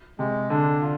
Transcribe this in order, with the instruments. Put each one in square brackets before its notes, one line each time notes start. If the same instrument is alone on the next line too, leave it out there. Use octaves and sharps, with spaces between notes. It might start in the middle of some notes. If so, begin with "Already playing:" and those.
[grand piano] C3 [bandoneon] G#3
[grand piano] D3 [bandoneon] D4
[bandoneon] F4